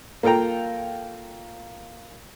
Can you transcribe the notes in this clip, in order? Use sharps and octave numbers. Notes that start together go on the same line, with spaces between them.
A#3 F4 A4 G5 A#5